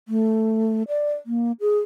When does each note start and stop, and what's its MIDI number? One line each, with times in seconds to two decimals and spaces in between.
0.08 0.83 57
0.88 1.13 74
1.26 1.52 58
1.60 1.79 68